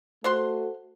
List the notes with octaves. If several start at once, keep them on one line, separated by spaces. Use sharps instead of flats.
A3 F#4 A4 C5 F#5 C6